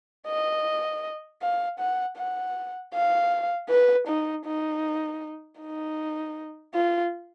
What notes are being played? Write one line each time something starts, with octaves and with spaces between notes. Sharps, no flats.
D#5
F5
F#5
F#5
F5
B4
D#4
D#4
D#4
F4